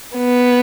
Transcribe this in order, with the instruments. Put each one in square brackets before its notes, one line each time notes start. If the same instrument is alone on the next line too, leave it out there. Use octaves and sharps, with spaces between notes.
[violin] B3